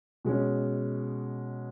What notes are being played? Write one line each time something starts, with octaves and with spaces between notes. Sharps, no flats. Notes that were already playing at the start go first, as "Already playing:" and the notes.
B2 G#3 C#4